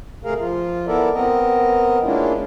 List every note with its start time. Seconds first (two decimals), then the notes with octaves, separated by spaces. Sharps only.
0.25 C3 A3 G#4 A#4 F5
0.40 F3 F4
0.87 B3 E4 A4 A#4 D5 E5
1.13 B3 C4 A#4 D#5
2.03 G#3 A#3 C#4 D4 E4 F4